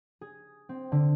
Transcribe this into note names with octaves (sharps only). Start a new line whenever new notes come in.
G#4
C4
D3